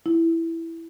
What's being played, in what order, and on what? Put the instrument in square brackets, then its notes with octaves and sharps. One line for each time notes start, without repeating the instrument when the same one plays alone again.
[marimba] E4